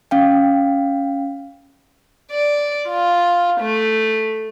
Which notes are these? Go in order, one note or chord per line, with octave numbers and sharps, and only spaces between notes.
C#4 F5 G5
D5
F4
A3